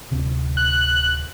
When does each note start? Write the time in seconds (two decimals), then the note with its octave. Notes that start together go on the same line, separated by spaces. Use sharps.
0.11 D1 C3 D4
0.57 F#6